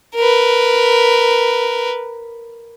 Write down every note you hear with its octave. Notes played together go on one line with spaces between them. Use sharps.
A#4 B4